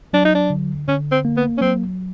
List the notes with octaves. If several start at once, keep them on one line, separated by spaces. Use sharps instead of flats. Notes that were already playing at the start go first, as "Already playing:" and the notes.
F#3 D4
D#4
D4
D3
D3 C#4
C4
A#3
B3
C#4
F#3 C4